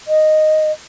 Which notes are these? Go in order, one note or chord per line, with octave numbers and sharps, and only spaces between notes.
D#5